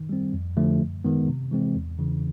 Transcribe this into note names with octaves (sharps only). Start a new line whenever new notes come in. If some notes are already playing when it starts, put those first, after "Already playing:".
Already playing: D#3
G3 C4
F2
D3 F3 A3
F#2
D#3 G#3 B3
C3
E3 G#3 C4
E2
C#3 E3